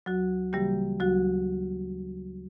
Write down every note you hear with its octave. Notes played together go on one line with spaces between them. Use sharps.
D2 F#3 F#4
C#3 E3 G3 A#3 G4
D2 F#3 F#4